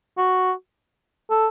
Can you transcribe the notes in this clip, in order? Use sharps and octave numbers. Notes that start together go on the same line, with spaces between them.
F#4
A4